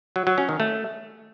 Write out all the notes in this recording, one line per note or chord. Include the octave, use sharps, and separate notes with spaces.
F#3
F#3
C#4
D#3
A3